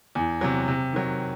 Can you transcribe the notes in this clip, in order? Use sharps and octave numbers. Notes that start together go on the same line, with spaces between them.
E2
C3 F#3
C3
D#3 F#3